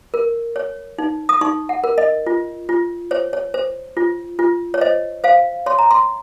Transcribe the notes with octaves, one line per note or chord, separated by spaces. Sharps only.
A#4
C#5
D#4
D#6
D#4 C#6
F#5
A#4
D#5
F4
F4
C5 C#5
C#5
C5
F4
F4
C#5
C5 D#5
C5 F5
C#5 C6
A#5
C6